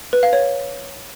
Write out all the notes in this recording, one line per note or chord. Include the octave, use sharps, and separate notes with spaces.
B4
F5
C#5